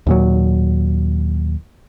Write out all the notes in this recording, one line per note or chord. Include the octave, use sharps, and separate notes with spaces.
D#2 A#2 F#3